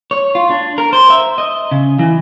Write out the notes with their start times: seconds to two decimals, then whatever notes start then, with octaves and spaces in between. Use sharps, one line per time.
0.11 C#5
0.35 F4
0.50 D4
0.78 A#4
0.93 C5
1.10 E5
1.38 D#5
1.71 C#3
1.99 E3